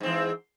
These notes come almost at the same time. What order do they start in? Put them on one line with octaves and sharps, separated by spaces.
G#2 C4 E3